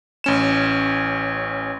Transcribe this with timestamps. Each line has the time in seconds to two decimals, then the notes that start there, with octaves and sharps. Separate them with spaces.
0.24 A1 C#4 E7